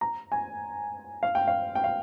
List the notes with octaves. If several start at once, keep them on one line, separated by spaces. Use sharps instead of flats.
A#5
G#5
F5
G5
F5
G5
F5